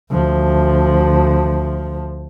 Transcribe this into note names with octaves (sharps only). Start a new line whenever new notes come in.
D2 F3